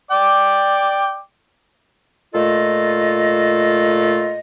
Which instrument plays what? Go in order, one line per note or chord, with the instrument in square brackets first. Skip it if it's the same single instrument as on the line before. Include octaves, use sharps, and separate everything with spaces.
[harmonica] D5 G5 D6
[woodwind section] A#2 A3 F4 A4 D#5